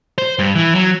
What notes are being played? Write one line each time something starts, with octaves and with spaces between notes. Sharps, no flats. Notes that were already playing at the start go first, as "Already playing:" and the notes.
C5
G2
E3
F#3